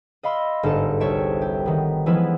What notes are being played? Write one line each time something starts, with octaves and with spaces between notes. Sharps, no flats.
D#5 F5 B5 C6 E6
G1 G#2 A4 A5
C2 C#5 E5 A5 D7
G4
D#3 B3
E3 F3 G#3 B3 E4 B4